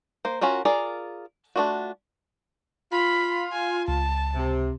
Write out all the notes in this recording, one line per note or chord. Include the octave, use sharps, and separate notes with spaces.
A#3 C5
C#4 F4 F#4 A#4
F4 G#4 A#4 D5
A3 A#3 D4 F4 F#4
F4 B5
G#5
C#2 A5
C3